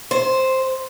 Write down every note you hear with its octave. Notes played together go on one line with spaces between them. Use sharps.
C5